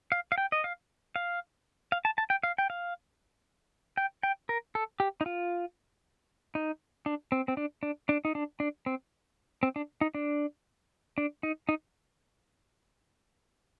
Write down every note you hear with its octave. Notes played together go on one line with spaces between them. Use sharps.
F5
F5
G5
D#5
F5
F5
F5
A5
A5
G5
F5
G5
F5
G5
G5
A#4
A4
G4
D#4
F4
D#4
D4
C4
C4
D4
D4
D4
D#4
D4
D4
C4
C4
D4
D#4
D4
D4
D#4
D#4